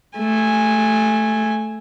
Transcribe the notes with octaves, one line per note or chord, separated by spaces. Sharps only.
A3 G#5